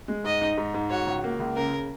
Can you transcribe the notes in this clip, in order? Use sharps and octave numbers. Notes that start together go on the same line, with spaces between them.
G#3
G#2 D#5
D#4
G#2
G#2
F#4 C#5
C#2
A#3
C#2
C#3 A#4